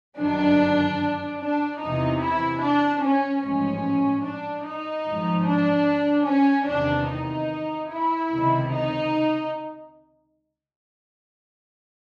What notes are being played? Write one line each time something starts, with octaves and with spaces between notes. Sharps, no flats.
G1 F#2 D#3 D4
D4
E2 C3 E3 D#4
E4
D4
C#4
A1 G#2 F3 C#4
D4
D#4
G#1 G#2 F3
D4
C#4
E2 C3 D#3 D4
D#4
E4
C#2 C3 D#3
D#4